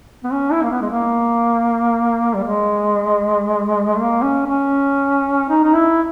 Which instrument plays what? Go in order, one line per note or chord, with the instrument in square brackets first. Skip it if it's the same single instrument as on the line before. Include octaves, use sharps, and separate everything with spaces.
[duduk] B3
C#4
E4
A#3
B3
G#3
A#3
G3
G#3
A#3
C#4
C#4
D#4
D#4
E4